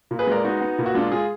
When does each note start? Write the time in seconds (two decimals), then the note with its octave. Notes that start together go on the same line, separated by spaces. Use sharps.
0.11 A#2
0.19 G#4 B4
0.27 G#3 A#4 D5
0.44 B3 D#4 F#4
0.61 B3
0.79 A#2
0.86 F#4
0.95 G#3 D4 F4
1.12 G#3 F4 G#4